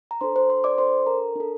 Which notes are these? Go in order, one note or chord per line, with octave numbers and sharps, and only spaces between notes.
A#5
D4 A4 C5 C6
C5 C6
C5 C6
D5 D6
D4 A4 C5 C6
A#4 A#5
D4 A4